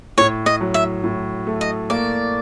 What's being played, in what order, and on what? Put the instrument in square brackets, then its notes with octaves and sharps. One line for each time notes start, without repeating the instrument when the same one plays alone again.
[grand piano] A2 [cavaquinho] C#5
[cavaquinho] D#5
[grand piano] F#3
[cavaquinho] E5
[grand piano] A2
A3
[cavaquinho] D#5
[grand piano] A#3 [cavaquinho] D5